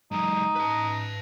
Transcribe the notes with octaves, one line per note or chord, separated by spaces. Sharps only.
F#3 G#3 D#4
B4 A5